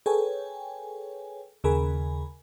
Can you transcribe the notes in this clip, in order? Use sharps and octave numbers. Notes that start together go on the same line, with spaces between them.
G#4 A4 B4 C#5 G5 G#5
D#2 C#3 G#4 A#4 G#5 B5